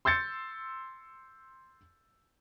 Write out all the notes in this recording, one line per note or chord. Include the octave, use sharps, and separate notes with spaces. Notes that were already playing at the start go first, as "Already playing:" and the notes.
C6 E6 G6 A6 C#7